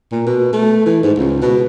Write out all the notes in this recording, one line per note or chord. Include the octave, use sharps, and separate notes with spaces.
A#2
B2
A3
E3
G#2
C#2
B2